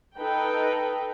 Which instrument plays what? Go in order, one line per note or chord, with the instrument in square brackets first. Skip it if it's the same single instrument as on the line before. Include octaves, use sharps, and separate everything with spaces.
[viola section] D#4 A4 B4 G5